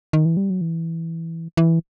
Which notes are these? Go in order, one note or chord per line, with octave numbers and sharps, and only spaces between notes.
D#3
E3
G3
F#3
E3
E3